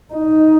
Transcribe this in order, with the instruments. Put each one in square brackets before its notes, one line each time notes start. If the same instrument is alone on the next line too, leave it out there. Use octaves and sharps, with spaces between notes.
[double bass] D#4